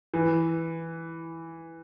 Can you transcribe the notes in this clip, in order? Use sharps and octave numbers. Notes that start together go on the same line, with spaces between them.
E3